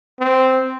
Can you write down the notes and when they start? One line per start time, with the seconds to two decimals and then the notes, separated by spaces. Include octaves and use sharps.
0.20 C4